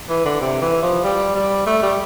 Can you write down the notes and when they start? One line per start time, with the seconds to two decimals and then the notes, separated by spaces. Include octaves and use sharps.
0.09 E3
0.25 D3
0.41 C3
0.61 E3
0.82 F3
1.04 G3
1.35 G3
1.66 A3
1.82 G3